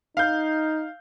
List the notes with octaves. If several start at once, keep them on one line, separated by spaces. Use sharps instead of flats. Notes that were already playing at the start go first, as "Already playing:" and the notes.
D#4 F5 G6